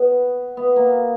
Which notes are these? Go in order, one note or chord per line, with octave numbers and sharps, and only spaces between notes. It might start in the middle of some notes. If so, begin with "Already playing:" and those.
Already playing: B3
B3
A#3